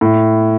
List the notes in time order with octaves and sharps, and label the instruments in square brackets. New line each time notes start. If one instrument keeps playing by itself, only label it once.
[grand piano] A2